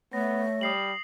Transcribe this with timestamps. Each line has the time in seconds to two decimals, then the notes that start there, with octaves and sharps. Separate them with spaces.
0.13 A3 B3 C#5 A#6
0.61 G3 D#6 C7 F#7